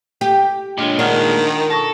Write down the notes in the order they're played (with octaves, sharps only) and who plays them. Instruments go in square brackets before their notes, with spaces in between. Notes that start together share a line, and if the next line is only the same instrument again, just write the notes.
[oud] G4
[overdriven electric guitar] A#2 G#3 [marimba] D4 F4 C#5
[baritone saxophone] D#3 [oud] D4 [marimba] F#5 F6
[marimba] B2 C#6 A#6 [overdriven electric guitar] A4